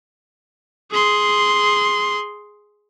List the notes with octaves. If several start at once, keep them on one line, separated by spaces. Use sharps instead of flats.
G#4 C6